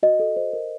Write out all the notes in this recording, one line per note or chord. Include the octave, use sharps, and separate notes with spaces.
F#4 D#5
A4
C5
A#4